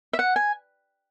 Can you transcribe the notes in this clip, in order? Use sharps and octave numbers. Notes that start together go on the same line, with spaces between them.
E5
F#5
G#5